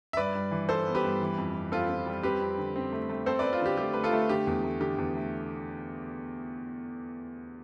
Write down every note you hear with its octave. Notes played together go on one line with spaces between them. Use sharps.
E5
G2 B4 D5
G2
E3
G2 A4 C5
B3
G4 B4
G2
E3
F2
F2
C4 F4 A4
C4
G3
C4 G4 B4
F2
D3
C4
A3
A3
C4 A4 C5
B4 D5
C4
F4
D3 G4
A3 G4
A3 B4
F4 A4
A3
D3 G4
E2
A3
D3 G4
E2
A3